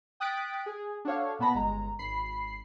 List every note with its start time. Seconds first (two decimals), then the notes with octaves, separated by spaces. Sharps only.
0.20 G5 D#6 F#6 A6 B6 D7
0.66 G#4
1.05 D4 F#4 A4 C#5 F5
1.39 A#2 B3 A5 B5 A#6
1.54 G1 G#3 A#5
1.99 G#1 B5 C7